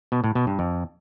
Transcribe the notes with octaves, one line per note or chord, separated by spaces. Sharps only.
B2
A2
B2
G2
F2